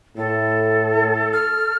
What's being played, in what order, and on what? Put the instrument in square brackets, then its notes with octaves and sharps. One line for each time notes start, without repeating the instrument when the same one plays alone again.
[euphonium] A2 [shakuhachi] A4
[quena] F6